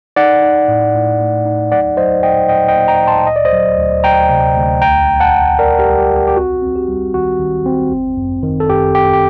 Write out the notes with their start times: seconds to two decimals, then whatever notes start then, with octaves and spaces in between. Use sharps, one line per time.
0.16 D#4 D5 F#5
0.42 D#4
0.68 A2
0.94 A2
1.21 A3
1.46 D#4
1.72 F#3 D5 F#5
1.97 F#3 C5 D#5
2.23 A#2 D#5 G5
2.49 A#2 D#5 G5
2.68 D#5 G5
2.75 A#3
2.88 G5 A#5
3.01 A#2
3.07 A5 C6
3.26 D2 D#5
3.36 D5
3.45 C5 D#5
3.53 F#3
3.78 D2
4.04 D2 G5 A#5
4.30 C3
4.56 D2
4.81 C2 G5 A#5
5.07 C2
5.20 F#5 A5
5.34 C2
5.59 C2 A#4 D5
5.79 G4 A#4
5.85 G3
5.98 G4
6.11 C2
6.17 G4
6.28 G4
6.36 C4 F#4
6.62 C4
6.75 G4
6.88 G3
7.14 D#3 F#4
7.39 D#3
7.66 C4
7.92 G1
8.17 F#2
8.43 D#3
8.60 A4
8.69 F#2 G4
8.95 D#3 G4
9.13 G4